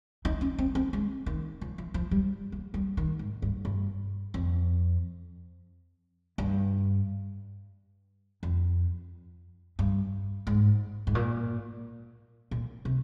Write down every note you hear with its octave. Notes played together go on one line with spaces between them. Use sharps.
D#4
C#4
C4
C4
G#3
D#3
F3
F3
F3
G3
A#3
G3
D#3
G#2
G2
G2
F2
G2
F2
G2
G#2
G#2
A#2
A#2
C3